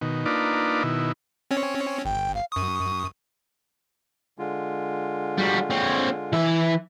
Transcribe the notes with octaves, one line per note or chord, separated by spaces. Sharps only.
B2 D#3
A#3 D4 D#4 F4 B4 D5
B2 D#3 E4
C4 C#4 C#5
G1 G5
F5
F#2 C#6 D#6
D3 G#3 F4
G3 F#4
C4 C#5
E3 E5